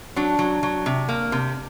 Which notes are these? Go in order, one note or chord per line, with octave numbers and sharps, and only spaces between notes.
F#3 D4
F#3
F#3
C3
A#3
C3